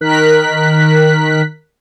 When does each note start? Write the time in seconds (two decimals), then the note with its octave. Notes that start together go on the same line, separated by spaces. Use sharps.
0.01 D#3 A#4 F#6 B6